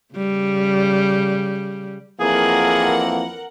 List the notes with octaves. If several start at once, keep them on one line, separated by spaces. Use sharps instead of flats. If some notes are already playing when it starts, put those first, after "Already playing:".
C#3 G3
F2 E3 A#3 G#4 A#4 F#5